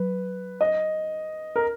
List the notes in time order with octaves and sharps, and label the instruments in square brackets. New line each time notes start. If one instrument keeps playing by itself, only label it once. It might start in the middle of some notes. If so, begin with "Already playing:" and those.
Already playing: [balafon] F#3 [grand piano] B4
[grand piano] D#5
A#4